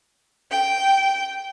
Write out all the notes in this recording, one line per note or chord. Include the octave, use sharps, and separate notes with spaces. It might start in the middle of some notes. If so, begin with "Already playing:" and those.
G5